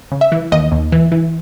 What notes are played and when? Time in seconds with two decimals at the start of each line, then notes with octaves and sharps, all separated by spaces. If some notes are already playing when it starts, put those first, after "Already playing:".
0.12 C#3
0.21 E5
0.32 E3
0.52 D#2 D#5
0.72 D#2
0.92 E3
1.12 E3